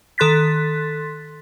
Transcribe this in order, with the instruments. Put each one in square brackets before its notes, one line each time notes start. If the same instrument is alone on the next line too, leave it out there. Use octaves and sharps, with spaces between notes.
[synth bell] D#3 A4 C6 F#6 A6 B6